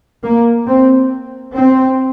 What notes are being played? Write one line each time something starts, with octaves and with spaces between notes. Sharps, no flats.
A#3
C4
C4